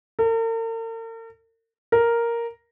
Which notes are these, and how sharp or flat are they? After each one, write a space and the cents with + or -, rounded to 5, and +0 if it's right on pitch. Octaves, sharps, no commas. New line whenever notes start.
A#4 -45
A#4 +0